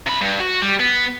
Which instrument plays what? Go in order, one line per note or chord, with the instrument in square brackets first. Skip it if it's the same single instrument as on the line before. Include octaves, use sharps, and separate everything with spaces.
[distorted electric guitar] C3 B5
G2
F#4
G3
B3